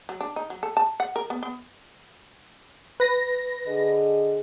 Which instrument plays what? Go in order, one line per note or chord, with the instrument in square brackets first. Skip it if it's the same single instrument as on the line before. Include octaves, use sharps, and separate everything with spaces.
[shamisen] F#3
D4
D#4
F#3
A4
A5
F#5
A#4
B3
B3
[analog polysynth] B4 A#6
[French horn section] D3 G#4 D#5